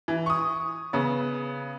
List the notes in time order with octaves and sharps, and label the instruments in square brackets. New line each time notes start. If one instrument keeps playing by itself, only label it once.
[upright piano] E3
C#6 D#6
C#3 B3